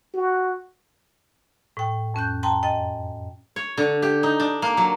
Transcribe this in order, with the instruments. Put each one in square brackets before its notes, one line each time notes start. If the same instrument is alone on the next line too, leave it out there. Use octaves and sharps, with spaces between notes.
[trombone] F#4
[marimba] A2 G5
F2 C#4 F#6 G6
G5 A5 A#5 C6
F#2 D#5 G5 G#5 A6
[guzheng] C#5
D3
G4
D#4
D4
A#3
F#3